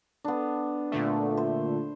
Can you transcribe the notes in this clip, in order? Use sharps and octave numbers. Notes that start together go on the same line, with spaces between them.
B3 D4
A#2 D3 A3
C5